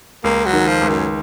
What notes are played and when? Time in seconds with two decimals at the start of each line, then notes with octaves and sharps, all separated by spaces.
0.24 C#2 A#3
0.45 F#3
0.53 D#3
0.68 F3
0.81 C#2
0.89 F#2